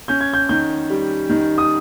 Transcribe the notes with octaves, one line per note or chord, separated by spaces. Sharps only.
C#4 G6
G#6
G6
D#3 G6
G3
D#3
D#6